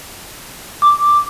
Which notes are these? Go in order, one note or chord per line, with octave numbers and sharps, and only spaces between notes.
D6